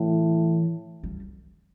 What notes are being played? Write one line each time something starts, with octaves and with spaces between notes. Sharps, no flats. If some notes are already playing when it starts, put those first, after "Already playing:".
Already playing: A2 E3
G3